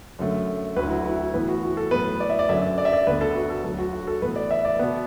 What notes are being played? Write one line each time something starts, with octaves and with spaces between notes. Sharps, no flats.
F#2 D3 A3
D2 D3 F#3 A3 B4
E4
F#4
E4
F#4
A2 E3 B3 B4
F#4
F#4
A4
A2 F#3 B3 B4
D5
E5
D5
F#2 D3 F#3 E5
D5
E5
D5
D2 D3 B3 B4
A4
F#4
A4
D2 D3 F#3 A4
F#4
F#4
A4
A2 E3 B3 B4
D5
E5
D5
B2 B3